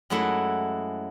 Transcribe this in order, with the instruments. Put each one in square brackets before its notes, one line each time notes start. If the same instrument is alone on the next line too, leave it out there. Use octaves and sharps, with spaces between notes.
[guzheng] F#2 F#3 G#3 A3 E4